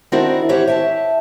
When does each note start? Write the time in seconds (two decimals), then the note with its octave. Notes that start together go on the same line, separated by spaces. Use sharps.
0.12 D#3 C4 D4 E4 F#4 A#4
0.49 E3 G4 C5 C#5 F#5
0.68 E5 G5 A5